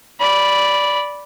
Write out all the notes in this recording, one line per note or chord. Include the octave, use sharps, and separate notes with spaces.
D5 B5